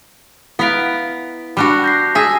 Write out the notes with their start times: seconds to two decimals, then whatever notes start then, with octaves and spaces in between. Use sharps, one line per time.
0.59 B3 E4 F5 B6 D7
1.57 G3 D4 F#4 B5 F#6
1.84 G6 A#6 C7
2.15 G#4 E5 G#5 E6 A#6